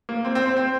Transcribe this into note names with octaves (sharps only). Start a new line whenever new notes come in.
A#3
C4
C4
C4
C4